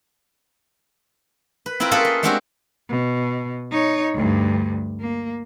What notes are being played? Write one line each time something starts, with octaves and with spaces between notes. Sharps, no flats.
B4
C4 E4 F4 A#4 B4
A#3 C#4 F4 G#4 A4 B4
D#5
G#3 A3 C4 D4 F#4 G4
B2
D#4 C#5
D2 G2
A#3